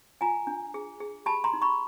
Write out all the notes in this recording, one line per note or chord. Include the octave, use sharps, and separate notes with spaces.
F4 G#5 A#5
D4
G#4
G#4
G4 A5 B5
A#5 C6
D#4
B5 C#6